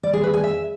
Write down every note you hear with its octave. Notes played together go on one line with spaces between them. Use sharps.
D5
G#4
B4
G#5
E5